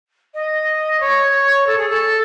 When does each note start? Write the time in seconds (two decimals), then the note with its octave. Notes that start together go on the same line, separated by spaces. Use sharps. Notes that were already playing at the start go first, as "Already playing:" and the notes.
0.34 D#5
1.00 C#5
1.67 A4
1.77 G#4
1.89 A4